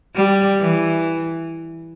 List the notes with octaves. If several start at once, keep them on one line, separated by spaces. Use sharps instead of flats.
G3
E3